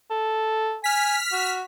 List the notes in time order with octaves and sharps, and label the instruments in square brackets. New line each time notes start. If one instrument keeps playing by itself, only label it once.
[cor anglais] A4
[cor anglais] G#5 [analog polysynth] F6 B6
[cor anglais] F#4